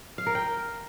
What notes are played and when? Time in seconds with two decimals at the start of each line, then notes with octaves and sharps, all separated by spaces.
0.18 F5
0.27 A#4
0.35 G5